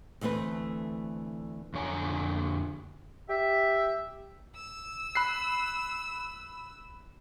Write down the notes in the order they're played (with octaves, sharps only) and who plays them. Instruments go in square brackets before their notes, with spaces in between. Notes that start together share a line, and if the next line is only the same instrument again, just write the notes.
[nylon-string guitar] D2 E3 A3 C4 B4
[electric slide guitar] F2 D3 C#5 G#5 A#5
[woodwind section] G4 E5
[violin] E6
[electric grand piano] B5 F#6 C7